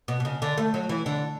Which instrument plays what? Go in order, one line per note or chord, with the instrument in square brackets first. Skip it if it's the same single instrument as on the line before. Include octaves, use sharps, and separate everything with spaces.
[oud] B2
B2
C#3
D3
A3
F#3
E3
D3